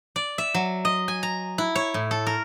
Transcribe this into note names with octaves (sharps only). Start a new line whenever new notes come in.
D5
E5
F#3
D#5
G#5
A#5
E4
C#5
A2
A4
A#4